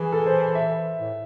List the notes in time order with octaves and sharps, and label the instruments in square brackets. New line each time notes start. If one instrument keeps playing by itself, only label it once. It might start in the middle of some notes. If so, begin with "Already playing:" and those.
Already playing: [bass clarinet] E3 [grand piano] G#4
[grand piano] A4
C5
E5
[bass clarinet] A2